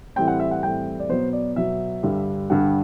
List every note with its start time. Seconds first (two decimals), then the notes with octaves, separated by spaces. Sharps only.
0.16 A2 E3 G3 C4 G5
0.28 F#5
0.40 E5
0.51 F#5
0.63 A2 E3 G3 C4 G5
1.00 D5
1.09 B2 F#3 B3 C5
1.33 D5
1.56 B2 F#3 B3 E5
2.03 G2 D3 G3
2.50 G2 D3 G3 F#5